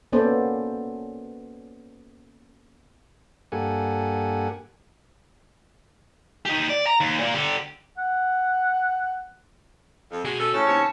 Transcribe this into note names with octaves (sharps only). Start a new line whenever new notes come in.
A#3 B3 C#4 A4 C5 D5
G2 A#3 G4 A4 F#5 G#5
D#4 G4
D5
A#5
D#2
A#2 A#3
D3 G4
F#5
F2
G#3 B3 F#4 G#4
C#4 A4
A2 C#3 A3 C#4 A5
D#2 C3 C#5